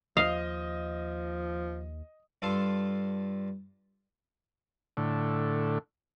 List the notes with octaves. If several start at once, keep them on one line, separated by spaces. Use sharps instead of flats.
D#2 F3 D#5 F5 D#6
G2 F4 A4 C6
A2 D3